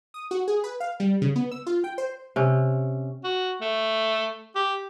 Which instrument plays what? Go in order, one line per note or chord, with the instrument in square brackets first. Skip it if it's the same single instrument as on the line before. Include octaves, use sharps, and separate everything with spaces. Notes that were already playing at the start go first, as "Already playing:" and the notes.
[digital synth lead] D#6
F#4
G#4
B4
F5
G3
C#3
B3
E6
F4
G5
C5
[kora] C3 C#4
[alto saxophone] F#4
A3
G4